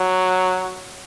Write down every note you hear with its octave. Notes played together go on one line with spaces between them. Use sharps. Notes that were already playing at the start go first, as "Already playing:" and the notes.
Already playing: F#3